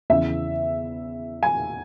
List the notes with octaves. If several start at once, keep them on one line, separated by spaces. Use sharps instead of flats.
E2 C#3 E3 E5
G#5